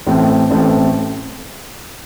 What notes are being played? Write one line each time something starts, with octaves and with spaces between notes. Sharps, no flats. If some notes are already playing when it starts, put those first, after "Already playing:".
A1 A2 A3 C4
A1 A2 A3 C4